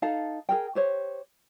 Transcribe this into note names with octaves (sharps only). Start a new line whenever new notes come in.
D#4 A4 F5 A5
G#4 A#4 G5
G4 C5 C#5